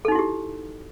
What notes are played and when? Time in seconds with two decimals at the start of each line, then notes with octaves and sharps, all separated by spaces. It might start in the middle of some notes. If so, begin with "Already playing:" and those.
0.05 A4
0.08 D#4
0.12 F#4
0.15 E4
0.19 G4